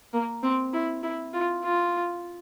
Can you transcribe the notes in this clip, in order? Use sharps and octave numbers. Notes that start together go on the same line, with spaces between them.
A#3
C4
E4
E4
F4
F4